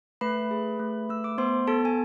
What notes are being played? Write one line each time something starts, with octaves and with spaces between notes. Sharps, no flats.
A3 B4 B5
G#4
A3
A3 E6
D6
B3 C5 C6
B3 A4 A5
G#5